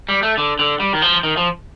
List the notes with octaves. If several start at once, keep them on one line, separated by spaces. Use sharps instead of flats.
G3
A3
D3
D3
G3
D#3
F3
D#3
F3